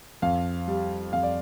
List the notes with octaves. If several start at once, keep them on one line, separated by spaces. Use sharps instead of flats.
F2 F5
G3
F2 F5
D5